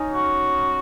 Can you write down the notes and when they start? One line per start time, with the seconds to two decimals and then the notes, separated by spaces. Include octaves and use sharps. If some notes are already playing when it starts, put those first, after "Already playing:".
Already playing: C#4 D#4
0.13 F#4